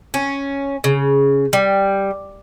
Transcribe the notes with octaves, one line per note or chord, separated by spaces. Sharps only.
C#4
C#3
G3